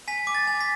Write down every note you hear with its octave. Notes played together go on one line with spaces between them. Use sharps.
G#5 B6
D6
A6
G#5
B6